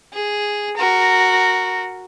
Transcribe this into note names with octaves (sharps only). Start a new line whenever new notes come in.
G#4
F#4 A#4